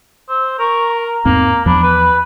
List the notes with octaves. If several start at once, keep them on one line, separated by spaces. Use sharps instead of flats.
C5 E6
A#4 C#6
A#5
E2 G#2 A#3 C4
E2 F3 D4 B5
B4